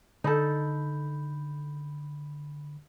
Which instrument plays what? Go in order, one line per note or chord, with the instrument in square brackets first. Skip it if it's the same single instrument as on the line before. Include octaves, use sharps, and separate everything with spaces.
[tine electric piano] D3 B5 G6 [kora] D#4 A4